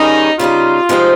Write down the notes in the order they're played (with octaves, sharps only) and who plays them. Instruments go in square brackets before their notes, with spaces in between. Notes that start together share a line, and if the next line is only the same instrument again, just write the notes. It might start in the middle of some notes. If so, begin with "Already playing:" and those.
Already playing: [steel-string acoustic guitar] D#3 G3 C#4 G#4 [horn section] D#4
[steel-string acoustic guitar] C#3 G3 A#3 D#4 [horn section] F4
[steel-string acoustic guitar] C3 F3 G#3 C4 D#4